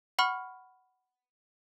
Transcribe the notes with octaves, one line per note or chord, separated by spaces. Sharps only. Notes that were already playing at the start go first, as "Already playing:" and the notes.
F#5 B5 C#6 F6